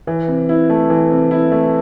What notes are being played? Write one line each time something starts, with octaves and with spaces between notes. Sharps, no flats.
E3
C3
E4
A3
E3
C3
E4
A3